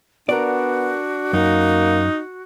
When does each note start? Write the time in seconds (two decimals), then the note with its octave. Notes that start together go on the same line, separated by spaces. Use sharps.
0.29 B3 D4 F#4 A#4 D5
1.33 F#2 A#3 D#4